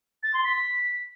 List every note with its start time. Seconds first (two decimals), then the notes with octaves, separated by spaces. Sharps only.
0.23 A6
0.33 C6
0.44 B6